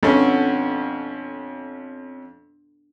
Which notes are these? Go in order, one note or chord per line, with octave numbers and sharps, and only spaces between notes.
F2 B3 C#4 D4 A4